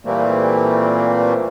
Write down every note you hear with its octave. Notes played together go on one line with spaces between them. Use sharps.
A#2 E3 G3 A3 A#3 C4